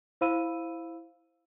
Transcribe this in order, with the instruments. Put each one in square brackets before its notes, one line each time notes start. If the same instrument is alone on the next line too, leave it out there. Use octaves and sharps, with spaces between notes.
[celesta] E4 C5 F5 B5 E6 D#7